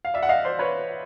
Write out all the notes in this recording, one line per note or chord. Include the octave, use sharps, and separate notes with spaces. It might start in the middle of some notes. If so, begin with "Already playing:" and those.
F5
D5 E5
F#5
D#5 F5
C5 D5
B4 C#5